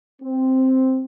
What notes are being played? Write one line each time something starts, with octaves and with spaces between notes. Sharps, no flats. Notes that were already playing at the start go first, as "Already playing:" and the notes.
C4